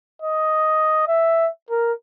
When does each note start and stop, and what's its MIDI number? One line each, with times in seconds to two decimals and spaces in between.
0.22 1.07 75
1.08 1.49 76
1.70 1.93 70